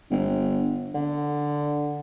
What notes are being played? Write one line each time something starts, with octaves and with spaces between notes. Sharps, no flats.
G1
D3